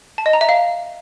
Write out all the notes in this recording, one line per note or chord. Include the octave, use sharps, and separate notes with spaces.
A5
D#5
A#5
E5
F5